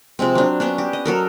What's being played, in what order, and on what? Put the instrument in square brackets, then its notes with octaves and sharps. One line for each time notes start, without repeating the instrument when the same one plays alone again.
[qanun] C3 F3 G#3 C4
F#3 D4
B3 C#4 D4
G4
D#5
F#3 A4 A#4